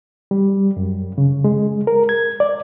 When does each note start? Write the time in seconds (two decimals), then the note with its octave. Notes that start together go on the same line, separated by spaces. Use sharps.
0.31 G3
0.77 F#2
1.18 C#3
1.44 G#3
1.87 A#4
2.09 G#6
2.40 D5